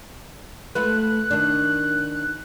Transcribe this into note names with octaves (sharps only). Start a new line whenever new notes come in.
A3 F4 B4 F#6
D#3 D4